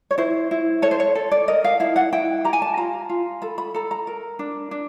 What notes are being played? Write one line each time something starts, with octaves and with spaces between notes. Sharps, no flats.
C#5
E4 C5
E4
A4 C#5
C5
C#5
A4
D5
A#4 D#5
F5
E4 F5
F#5
E4 G5
G4 A#5
G#5
A5
F4 A#5
F4
A4 B5
B5
A4 A#5
A#5
A#4
D4
D4